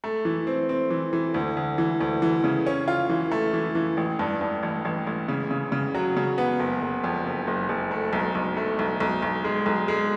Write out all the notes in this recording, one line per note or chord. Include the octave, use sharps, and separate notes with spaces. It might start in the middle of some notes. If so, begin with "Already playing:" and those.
A3
E3
C4
C4
E3
E3
D2
D2
E3
D2
E3
C#3
C#4
F4
E3
A3
E3
E3
A1
G2
G2
A1
A1
A1
C#3
C#3
C#3
F#3
C#3
B3
F#1
F#1
F2
F#1
F#1
F#1
A3
B1
B1
A3
B1
B1
B1
G#3
B1
G#3